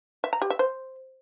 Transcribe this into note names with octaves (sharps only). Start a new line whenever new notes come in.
E5
A#5
G4
E5
C5